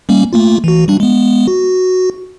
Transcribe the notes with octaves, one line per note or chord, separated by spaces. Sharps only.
G3 A#3 C#4
A3 A#3 F4
E3 F#4
G3 D4
G#3 B3
F#4